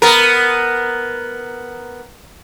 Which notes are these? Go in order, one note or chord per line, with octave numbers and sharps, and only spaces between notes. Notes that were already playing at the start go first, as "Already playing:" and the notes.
B3 A#4